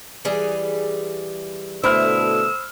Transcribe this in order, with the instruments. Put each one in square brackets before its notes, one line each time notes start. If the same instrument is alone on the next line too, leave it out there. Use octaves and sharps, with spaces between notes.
[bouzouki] E3 G3 G#4
[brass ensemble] B2 D3 A3 [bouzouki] E4 [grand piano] C5 B5 F6 [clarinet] E6